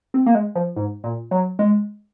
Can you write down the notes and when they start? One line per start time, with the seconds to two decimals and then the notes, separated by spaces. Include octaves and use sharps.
0.14 C4
0.26 A#3
0.35 G#3
0.55 F3
0.76 G#2
1.04 A#2
1.31 F#3
1.59 G#3